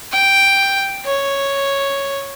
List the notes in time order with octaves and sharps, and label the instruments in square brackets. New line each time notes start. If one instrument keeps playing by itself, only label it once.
[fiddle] G5
C#5